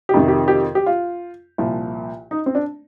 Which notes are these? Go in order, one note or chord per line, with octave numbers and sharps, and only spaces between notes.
G4
F2 C3 D#3
G4
G4
G4
F4
C2 A#2 F3
D#4
C4
D4